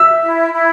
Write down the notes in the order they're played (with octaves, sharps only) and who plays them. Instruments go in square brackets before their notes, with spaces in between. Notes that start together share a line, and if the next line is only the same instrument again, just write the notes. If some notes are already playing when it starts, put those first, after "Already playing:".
Already playing: [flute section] E5 [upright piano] E6
[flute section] E4
E4